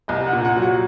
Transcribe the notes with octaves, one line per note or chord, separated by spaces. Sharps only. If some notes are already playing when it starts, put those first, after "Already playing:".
C2 D#5
F#5
A#2
F#5
F#3
F#5